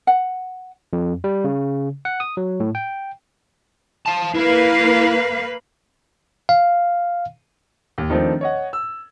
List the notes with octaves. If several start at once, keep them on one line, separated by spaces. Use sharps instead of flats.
F#5
F2
G3
C#3
F#5
D#6
F#3
A2
G5
F5 A5
A#3 E4 B4 F5
F5
D#2
D#3 F3 A3 C4 D4
C#5 D#5 F#5
E6